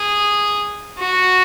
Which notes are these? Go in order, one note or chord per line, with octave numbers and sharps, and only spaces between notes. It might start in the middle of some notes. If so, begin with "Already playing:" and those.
Already playing: G#4
F#4